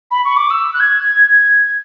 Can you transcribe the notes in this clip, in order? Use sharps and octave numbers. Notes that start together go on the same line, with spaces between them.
B5
C#6
D6
E6
F#6
G#6